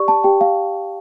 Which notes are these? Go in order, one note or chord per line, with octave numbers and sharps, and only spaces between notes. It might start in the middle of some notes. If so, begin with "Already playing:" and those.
Already playing: G4 D5 C#6
A5
G4 G5
F5